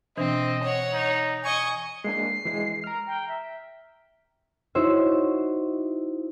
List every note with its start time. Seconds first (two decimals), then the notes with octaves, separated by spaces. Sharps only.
0.18 B2 E3 C4 D4 D#5
0.63 C#5 F#5
0.94 D#4
1.44 D#5 G#5 C#6
2.04 G#3 A#3 D4 C7
2.45 E3 G#3
2.84 A#5 F6
3.07 G5
3.29 E5
4.75 D#4 E4 F#4 C5 C#5 E5